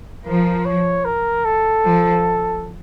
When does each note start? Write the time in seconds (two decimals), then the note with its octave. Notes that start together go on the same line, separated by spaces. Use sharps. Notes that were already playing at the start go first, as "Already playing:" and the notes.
0.25 F3 A#4
0.65 C#5
1.05 A#4
1.46 A4
1.86 F3